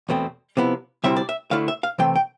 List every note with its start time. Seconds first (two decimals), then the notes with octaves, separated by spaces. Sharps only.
0.09 E2 B2 A3 C4
0.57 C3 F3 B3 E4
1.04 D2 C3 G3 C4 E4 E5
1.16 D5
1.29 E5
1.51 D2 D3 A3 E4 F5
1.68 E5
1.83 F5
1.98 C3 E3 A3 C4 G5
2.16 G5